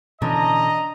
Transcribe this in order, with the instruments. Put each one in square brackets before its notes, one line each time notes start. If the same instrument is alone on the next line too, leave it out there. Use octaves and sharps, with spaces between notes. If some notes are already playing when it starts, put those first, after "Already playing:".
[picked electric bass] B2 E3 C#4 [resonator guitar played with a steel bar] D3 [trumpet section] D#5 A#5